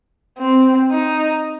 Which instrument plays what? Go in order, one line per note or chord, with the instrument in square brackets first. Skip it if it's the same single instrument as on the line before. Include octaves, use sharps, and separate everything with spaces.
[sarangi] C4
D#4